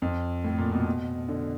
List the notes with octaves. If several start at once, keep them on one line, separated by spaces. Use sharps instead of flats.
F2
A2
A#2
B2
D3